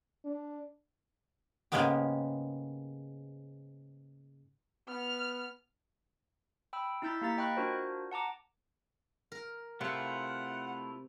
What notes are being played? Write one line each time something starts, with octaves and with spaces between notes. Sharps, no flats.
D4
G#2 C#3 G#3 A#3 B3 G4
B3 F6
G5 B5 E6
D#4 E4 E6 G6 A6 B6
A#3 G4 A#5 A6 B6
D#5 G5 B5 C#6 F#6 A6
D4 F4 F#4 A#4 C5
F#5 A5 A#5 D6
A#4
C3 A3 E4 F4 F#5